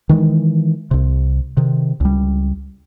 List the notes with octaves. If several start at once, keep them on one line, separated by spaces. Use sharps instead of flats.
D#3 E3 G#3
C2 C3
C3 D#3
C#2 G3